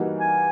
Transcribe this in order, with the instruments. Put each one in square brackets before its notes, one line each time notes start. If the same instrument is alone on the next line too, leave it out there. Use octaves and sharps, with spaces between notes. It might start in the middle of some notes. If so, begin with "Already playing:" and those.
Already playing: [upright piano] E3 G3 A#3 D#4 F#4
[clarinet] G#5